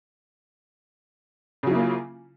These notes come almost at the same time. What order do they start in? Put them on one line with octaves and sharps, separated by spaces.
C#3 F#3 E4 A#3 F4